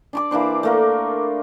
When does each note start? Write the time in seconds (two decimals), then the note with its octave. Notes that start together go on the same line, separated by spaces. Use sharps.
0.13 D4 D5 D6
0.31 E3 A#3 D4 C5
0.63 A3 A#3 A#4